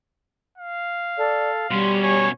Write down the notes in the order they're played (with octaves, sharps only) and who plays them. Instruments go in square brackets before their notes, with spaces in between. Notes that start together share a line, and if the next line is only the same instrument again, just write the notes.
[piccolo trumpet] F5
[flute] A4 [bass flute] D5
[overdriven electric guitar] B2 C#4 [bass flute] G3 [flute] C6
[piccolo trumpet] C#5 [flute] G#5